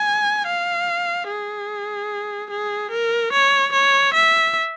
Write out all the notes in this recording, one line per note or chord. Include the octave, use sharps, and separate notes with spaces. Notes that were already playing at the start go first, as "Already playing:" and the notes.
Already playing: G#5
F5
G#4
G#4
A#4
C#5
C#5
E5